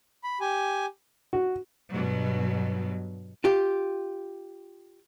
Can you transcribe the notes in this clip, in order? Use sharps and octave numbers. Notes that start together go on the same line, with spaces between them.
B5
G4 G#5
F#4
G2 B2 F#3
F4 G4